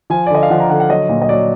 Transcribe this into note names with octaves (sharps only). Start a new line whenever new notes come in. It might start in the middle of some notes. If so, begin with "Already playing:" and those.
F3 G#5
D5
D3 D#5
F5
F3 F#5
A#5
D3 F#5
F#5
F#3 D#5
A#2
D#5
F#3 D5